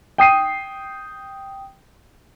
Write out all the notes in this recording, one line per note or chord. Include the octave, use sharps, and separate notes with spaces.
G5 D#6 C7 D#7